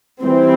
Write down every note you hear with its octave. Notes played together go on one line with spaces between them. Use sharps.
E3 G3 C4